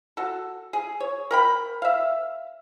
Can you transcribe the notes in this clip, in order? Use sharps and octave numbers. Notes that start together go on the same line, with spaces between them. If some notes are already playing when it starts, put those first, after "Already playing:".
F#4 A4
G#4
C#5
A#4 G5 B5
E5 F5